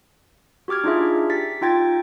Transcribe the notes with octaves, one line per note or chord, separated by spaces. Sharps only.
F#4 G4 D6 F6 G#6
D4 D#4 F4 G#4 E5
G4 A6 B6
D#4 F4 G5 G#6 A6